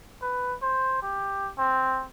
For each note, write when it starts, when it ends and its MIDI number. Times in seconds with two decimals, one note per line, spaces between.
0.22 0.55 71
0.62 0.97 72
1.02 1.50 67
1.58 2.05 60